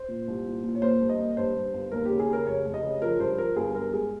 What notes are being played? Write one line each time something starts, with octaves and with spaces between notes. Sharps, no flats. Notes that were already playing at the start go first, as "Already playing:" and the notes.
Already playing: C5
A#2
C2
A#2
A#2
C#5
A#3 C5
G2
D#5
A#3
G2 C5
G2
G1
D#2 A#4
C#3 G4
G#4
C#3 A#4
F1 C#5
F1
D#5
C#3
F3 A#4
G2 C5
F3 A#4
G1 G#4
G1 A#4
G#3 G#4